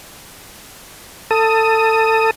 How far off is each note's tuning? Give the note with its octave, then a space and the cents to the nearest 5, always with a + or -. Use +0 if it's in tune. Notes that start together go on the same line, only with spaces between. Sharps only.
A4 +20 D#6 +10